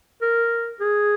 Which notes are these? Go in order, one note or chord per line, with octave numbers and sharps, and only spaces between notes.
A#4
G#4